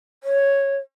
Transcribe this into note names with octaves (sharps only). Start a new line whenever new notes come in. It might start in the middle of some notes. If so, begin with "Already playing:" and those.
C#5